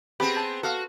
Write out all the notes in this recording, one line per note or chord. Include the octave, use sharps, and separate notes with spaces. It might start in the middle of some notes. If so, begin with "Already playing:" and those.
B3 C4 G4 G#4 B5
A5
F#4 A4 F5